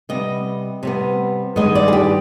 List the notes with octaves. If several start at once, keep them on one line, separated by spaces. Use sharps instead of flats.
C3 G3 B3 D#5
C3 G3 B3
G2 D#3 G#3 B3 D#5
D5
G#4
G4